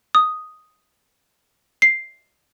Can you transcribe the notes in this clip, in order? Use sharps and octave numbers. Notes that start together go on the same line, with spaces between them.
D#6
C7